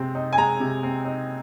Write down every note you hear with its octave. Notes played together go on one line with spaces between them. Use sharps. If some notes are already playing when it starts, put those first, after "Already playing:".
Already playing: C3 G#3 C4
D#4
G#5
G#3 A#5
C3
C4
D#4